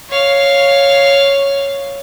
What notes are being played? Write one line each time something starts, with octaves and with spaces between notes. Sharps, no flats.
C#5 F5